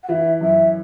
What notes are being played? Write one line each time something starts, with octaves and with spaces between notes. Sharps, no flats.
F#5
E3 E5
F#2 E5